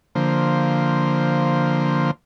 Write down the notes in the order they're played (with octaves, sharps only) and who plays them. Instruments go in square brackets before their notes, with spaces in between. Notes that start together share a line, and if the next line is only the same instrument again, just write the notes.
[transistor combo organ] D3 F3 A#3 C5